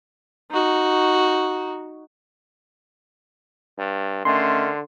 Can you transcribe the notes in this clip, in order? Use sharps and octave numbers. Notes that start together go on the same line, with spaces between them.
D#4 F#4
G2
D3 D#3 A3 C#4 C6